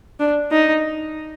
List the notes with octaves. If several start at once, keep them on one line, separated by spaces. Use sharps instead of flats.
D4
D#4